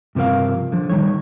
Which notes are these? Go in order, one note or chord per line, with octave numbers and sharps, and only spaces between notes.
G2 C3 F3 A#4 F5
D3 F3
D#3 G3 D#4 C#5